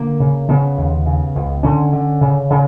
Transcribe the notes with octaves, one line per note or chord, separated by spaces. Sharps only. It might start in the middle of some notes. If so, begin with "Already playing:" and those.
Already playing: D3 A#3
C#3
C#3 B3
D#2
C#3
C#2
D3 C#4
D3
C#3
C#3